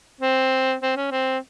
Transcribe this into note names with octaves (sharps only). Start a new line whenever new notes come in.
C4
C4
C#4
C4